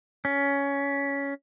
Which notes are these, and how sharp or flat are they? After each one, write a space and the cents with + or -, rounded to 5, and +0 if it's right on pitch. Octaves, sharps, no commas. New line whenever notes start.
C#4 +15